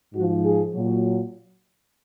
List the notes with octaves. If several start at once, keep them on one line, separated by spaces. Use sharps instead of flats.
G#2 F3 F#4
G#4
A#2 F#3